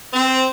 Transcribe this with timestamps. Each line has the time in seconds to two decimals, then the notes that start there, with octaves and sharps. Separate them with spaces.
0.13 C4